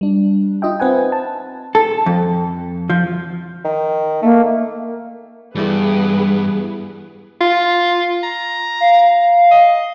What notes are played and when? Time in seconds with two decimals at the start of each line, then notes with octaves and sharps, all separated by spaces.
0.01 G3 D4
0.62 D#4 F4 D#5 E5 G5
0.80 C4 B4 F#5 G#5
1.12 A5
1.75 A4
2.06 F2
2.90 F3
3.64 D#3
4.23 A3 A#3
5.55 G2 E3 G3 B3 E4 G#4 B4
7.41 F4
8.23 A#5
8.80 F5
9.51 D#5